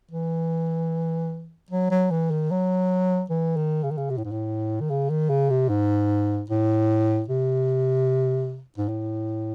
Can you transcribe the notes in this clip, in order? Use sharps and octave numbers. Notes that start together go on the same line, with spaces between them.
E3
F#3
F#3
E3
D#3
F#3
E3
D#3
C#3
D#3
C#3
C3
A2
G#2
A2
D#3
C#3
D#3
C#3
C3
G#2
A2
C3
G#2
A2